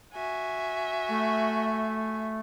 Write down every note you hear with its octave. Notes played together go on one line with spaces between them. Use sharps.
F#4 E5 G#5
A3